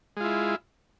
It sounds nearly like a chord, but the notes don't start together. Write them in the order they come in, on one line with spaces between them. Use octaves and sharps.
G#3 F4 E4